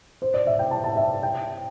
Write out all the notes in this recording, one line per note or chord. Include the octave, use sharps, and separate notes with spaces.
C5
D5
E5
G5
A5
A5
E5
G5